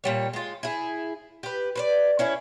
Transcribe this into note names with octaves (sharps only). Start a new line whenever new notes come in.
A#2 G3 C#5
G#3 F4
E4 G#4
G4 B4
B4 C5 D5
C#4 E4 G#4